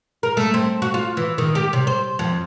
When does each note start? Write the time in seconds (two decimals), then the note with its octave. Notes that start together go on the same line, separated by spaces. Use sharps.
0.23 A#4
0.37 A3
0.54 C4
0.82 F#4
0.94 F4
1.17 E3
1.38 D#3
1.55 G4
1.73 C3
1.87 C5
2.19 F2